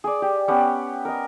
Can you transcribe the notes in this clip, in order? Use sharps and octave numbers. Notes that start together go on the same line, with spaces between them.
G#4 D5
G4
B3 C#4 G4 F#5
A#4 D#5